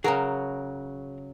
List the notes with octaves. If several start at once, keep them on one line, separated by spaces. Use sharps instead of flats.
C#3 F#3 G#4 A#4 A#5